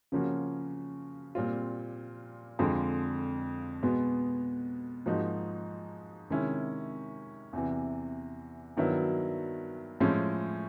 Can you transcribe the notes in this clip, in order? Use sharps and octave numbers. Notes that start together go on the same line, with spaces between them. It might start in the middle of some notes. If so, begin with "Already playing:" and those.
C#3 F3 A#3 C#4 F#4
A#2 G3 C4 F4
F2 D3 F3 G#3
B2 G#3 B3
G#2 F3 A#3 D#4 F#4
C3 D#3 G#3 C#4 E4
E2 C3 E3
G2 D#3 F#3 B3 E4
A2 F3 G#3 C#4 E4